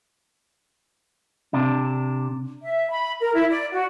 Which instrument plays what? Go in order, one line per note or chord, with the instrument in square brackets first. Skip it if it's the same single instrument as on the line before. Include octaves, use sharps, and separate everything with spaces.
[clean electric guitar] C3 D4
[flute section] E5
B5
A#4
E4
D5
F#4